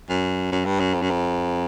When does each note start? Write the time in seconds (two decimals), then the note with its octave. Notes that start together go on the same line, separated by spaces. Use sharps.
0.09 F#2
0.52 F#2
0.65 G2
0.80 F#2
0.94 F2
1.02 F#2
1.10 F2